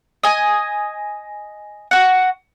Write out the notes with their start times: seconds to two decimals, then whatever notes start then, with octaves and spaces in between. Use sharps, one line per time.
0.23 D#5 G#5
1.91 F#4 F#5